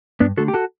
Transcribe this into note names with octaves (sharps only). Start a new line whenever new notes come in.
G2 B3 D4
D3 A3 F#4 A4
G4
F#4 A4